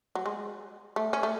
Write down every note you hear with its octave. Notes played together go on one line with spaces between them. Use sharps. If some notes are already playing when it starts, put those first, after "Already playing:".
F#3
G#3
A3
C#4
A3